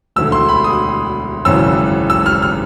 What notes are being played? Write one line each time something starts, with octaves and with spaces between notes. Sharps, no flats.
E1 D2 D3 E6
C6
B5
D#6
G#1 F#2 C#3 E3 E6
E6
F6
F6